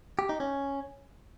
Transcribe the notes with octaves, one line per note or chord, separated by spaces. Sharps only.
G4
D#4
C#4